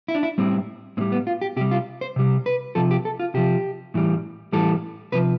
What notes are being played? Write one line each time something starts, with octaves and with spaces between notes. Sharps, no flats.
E4
D4
E4
A2 G3 C4
A2 G3 C4
B3
F4
G4
C3 G3 G4
F4
C5
C3 G3
B4
C3 F3 A4
G4
A4
F4
C3 F3 G4
A2 E3 G3
A2 E3 G3 A4
C3 F3 B4